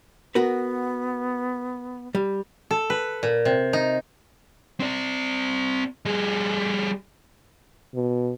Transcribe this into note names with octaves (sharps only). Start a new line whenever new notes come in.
B3 F#4 A#4 B4
G3
A4
B4
A#2
C3
D#4
C4 D5
G3 G#4
B2